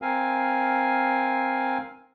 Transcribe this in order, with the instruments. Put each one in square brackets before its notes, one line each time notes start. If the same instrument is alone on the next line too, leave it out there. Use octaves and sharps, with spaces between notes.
[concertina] C4 A#4 F5 G#5